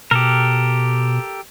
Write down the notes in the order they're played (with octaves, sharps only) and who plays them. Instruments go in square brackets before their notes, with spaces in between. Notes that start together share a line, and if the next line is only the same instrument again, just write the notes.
[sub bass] B2 [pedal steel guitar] G4 A4 A#4